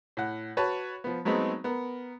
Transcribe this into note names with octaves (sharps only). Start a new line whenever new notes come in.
A2 F#5
F#4 B4 C#5 A5
F3 B3
F#3 G#3 A3 B3 C4 D#4
B3 A#4